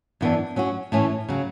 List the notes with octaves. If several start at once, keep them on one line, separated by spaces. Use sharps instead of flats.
F#2 E3 B3 D4
F#3 C#4 F#4
A2 E3 A3 C#4
C#3 F#3